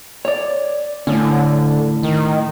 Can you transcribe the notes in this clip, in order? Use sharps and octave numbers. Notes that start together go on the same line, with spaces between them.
C#5 D5
A2 D3 C#4
D#3